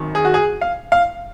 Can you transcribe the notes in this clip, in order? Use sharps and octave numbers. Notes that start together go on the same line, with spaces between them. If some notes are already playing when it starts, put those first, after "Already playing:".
Already playing: G#1 F#2 D#3
G#4
F#4
G#4
F5
F5